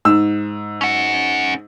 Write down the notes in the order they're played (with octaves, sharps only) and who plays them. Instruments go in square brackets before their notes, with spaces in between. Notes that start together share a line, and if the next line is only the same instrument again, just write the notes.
[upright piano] G#2 E6
[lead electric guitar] C#4 F#5